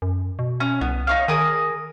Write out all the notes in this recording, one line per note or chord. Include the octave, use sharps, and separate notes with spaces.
F#2
B2
C#4
C2 B3
D#4 C#5 F5
D#3 G#4 A#4 D#6